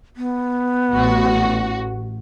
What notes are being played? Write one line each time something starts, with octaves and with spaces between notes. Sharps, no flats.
B3
A1 F#4